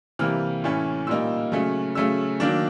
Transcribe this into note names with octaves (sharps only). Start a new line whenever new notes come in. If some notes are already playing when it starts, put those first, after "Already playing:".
C3 E3 G3 A#3 F6
A2 E3 A3 C#4
A#2 G3 A#3 D#4 E6
C#3 F#3 A3 C#4
C#3 F#3 A3 C#4 E6
D#3 F#3 A#3 D4